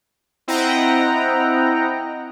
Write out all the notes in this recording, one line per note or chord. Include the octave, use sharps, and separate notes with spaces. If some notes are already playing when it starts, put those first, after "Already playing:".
C4 E4 D#5 F#5 G5 A#5